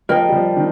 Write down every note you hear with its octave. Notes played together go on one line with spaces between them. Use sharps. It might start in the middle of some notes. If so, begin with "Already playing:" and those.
F3 A#4 D#5 G5
G3
F3
D#3